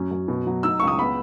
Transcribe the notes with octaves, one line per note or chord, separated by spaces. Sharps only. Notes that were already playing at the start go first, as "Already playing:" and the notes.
Already playing: F#2 C#4
F#2
B2
F#3
D#4 E6
C#2 C#6
D#6
B3 B5